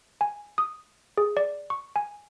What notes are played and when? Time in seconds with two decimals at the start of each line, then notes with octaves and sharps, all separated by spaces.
0.21 G#5
0.58 D#6
1.18 G#4
1.37 D5
1.70 C#6
1.96 G#5